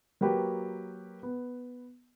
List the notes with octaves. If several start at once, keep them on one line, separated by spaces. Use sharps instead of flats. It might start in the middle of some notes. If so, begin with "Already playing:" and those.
F#3 A#3 F#4 G4 B4
B3